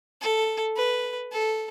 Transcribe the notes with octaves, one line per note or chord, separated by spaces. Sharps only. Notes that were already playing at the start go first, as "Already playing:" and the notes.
A4
B4
A4